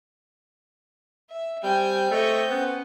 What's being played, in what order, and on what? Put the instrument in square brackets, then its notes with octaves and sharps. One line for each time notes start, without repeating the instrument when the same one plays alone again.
[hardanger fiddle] E5
[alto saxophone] G3 [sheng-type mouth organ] C4 G6 [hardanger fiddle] G5 G#5
[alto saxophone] A3 [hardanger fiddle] C#5 D#5
[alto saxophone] B3 [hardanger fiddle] C#4